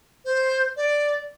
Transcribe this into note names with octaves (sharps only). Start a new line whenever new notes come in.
C5
D5